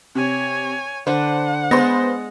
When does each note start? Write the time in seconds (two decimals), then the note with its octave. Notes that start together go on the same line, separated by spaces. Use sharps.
0.15 C3 C#5 G#5
1.07 D3 D4 B4 C5 F#5
1.71 G#3 B3 B4 C5 C6 A#6